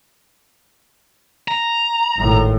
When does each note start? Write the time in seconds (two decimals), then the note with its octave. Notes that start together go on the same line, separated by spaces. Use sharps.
1.48 A#5
2.18 G#1 A2